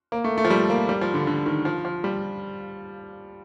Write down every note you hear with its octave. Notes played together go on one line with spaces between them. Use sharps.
A#3
A3
A3
F3
G3
A#3
G3
F3
D3
D3
D#3
F3
F3
G3